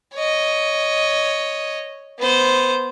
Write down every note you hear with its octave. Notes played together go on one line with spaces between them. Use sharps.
C#5 D#5
B3 C5